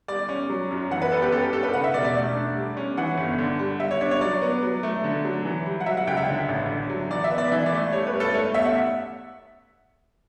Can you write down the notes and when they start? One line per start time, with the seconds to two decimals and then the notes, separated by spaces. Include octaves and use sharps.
0.08 G3 D5
0.29 C#4
0.50 F#3
0.71 F#2
0.91 E3 F#5
1.02 B4
1.12 B3 A4
1.22 G4
1.32 C#4 A4
1.42 G4
1.53 G2 A4
1.63 B4
1.73 C#3 F#5
1.84 E5
1.94 E1 D5
2.05 D5
2.15 A3
2.35 D4
2.56 G3
2.77 C#4
2.97 E3 F#5
3.17 G1
3.38 D3
3.59 G3
3.80 G3 E5
3.91 C#5
4.01 D4 C#5
4.11 C#5
4.21 F#3 D5
4.42 B3
4.63 F#3
4.83 A3
5.04 D3
5.25 F#3
5.45 E3
5.66 G3
5.80 F#5
5.86 F#3 E5
5.97 F#5
6.07 C#2 G5
6.17 E5
6.28 D3
6.48 A1
6.69 D3
6.90 F#3
7.10 E3 D5
7.24 E5
7.31 B3
7.38 D5
7.52 E3 E5
7.66 D5
7.72 A3
7.93 G3 C#5
8.07 B4
8.14 G2
8.20 A4
8.34 A3 C#5
8.54 E2 E5
8.65 F#5